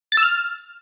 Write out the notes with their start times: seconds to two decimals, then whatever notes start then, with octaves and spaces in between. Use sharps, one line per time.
0.12 A6
0.17 E6
0.23 F6